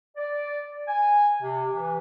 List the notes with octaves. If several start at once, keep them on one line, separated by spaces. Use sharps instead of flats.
D5
G#5
C3
E3